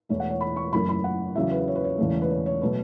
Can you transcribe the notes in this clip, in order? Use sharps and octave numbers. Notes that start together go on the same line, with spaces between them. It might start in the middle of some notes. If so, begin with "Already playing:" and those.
E1 E2 E3 A3 C#5
F#5
C#5
B5
C#6
F#1 F#2 E3 A3 B5
B5
F#5
E2 C#3 F#3 E5
B4
C#5
B4
C#5
E1 E2 C#3 A3
B4
C#5
C#5
B2 F#3 A3 B4